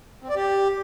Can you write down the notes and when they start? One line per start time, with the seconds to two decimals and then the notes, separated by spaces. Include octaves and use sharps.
0.22 C4
0.29 D5
0.36 G4